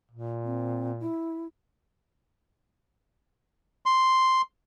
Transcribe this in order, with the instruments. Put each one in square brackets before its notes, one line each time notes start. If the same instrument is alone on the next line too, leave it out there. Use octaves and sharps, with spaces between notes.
[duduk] A#2
[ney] C4
E4
[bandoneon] C6